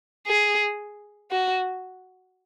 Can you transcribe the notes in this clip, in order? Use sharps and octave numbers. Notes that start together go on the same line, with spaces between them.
G#4
F#4